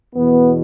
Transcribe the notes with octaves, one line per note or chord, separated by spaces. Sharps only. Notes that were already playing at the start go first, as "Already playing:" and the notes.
E2 B2 B3